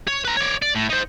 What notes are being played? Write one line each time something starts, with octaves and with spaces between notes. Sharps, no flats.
C#5
B4 A#5
C#5 D5
D5
A2
D#4 C5